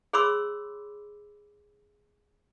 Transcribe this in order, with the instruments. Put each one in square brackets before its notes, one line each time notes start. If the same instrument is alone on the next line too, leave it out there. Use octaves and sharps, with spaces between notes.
[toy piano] G#4 C#5 B5 C6 D6 E6